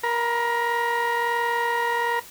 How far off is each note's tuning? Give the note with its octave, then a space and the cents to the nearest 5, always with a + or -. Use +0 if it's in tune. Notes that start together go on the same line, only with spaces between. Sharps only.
A#4 +15 B5 -10